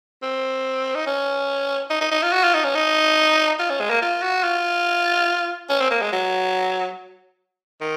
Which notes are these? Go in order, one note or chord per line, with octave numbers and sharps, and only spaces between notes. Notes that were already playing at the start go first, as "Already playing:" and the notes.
C4
D#4
C#4
D#4
D#4
D#4
F4
F#4
F4
D#4
C#4
D#4
F4
C#4
G#3
A#3
F4
F#4
F4
C#4
C4
A#3
G#3
F#3
D#3